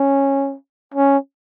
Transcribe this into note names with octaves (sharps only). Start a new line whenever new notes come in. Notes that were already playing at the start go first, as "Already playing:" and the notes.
Already playing: C#4
C#4